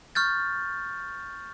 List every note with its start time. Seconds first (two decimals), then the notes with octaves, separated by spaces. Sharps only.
0.15 C#6 F6 G6 A6